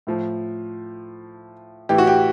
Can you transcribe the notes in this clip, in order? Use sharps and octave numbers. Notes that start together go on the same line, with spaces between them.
A2 F3
A2 E3 G4
F#4
G4